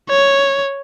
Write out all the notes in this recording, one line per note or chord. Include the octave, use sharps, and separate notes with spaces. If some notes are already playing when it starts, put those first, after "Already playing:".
C#5